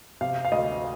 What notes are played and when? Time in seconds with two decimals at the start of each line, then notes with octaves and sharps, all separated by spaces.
0.21 C3 F5
0.45 F5
0.52 D2 D#5